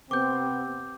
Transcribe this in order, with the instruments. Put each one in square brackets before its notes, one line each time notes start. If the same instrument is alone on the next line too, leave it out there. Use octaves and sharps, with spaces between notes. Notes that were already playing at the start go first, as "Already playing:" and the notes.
[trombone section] C3 B3 C4 [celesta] D6 G6